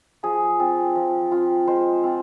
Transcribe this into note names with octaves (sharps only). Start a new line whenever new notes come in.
F3 G#4
C4 F4
F3
C4 F4
G#3 C5
C4 F4